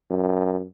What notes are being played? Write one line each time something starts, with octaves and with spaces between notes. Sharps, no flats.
F#2